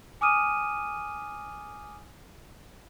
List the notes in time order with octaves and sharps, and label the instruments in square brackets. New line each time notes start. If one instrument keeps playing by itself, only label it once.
[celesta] G#5 D6 D#6 F6 D#7